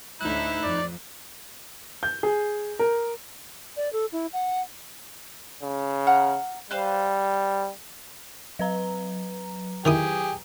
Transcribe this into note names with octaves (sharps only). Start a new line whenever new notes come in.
D2 A2 D#4 E4 E5 F#6
F2 D5
G6
G#4
A#4
D5
A4
E4
F#5
C#3
F#5 A#5 F6
G3 B4 C5 F5
F#3 B4 A#5
D#3 E4 G4 G#4 D#6